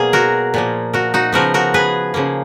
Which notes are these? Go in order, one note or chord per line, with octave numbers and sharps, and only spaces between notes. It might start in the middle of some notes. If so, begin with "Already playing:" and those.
Already playing: B2 F#3 A#3 G#4
F#4 A#4
A#2 F3 A#3
F#4 A#4
D#4 F#4
C#3 F3 B3 F#4 A#4
F#4 A#4
G#4 B4
C#3 F3 A#3